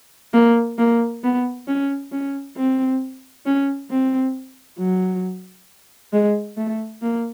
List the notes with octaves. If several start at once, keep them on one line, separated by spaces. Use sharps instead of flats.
A#3
A#3
B3
C#4
C#4
C4
C#4
C4
F#3
G#3
A3
A#3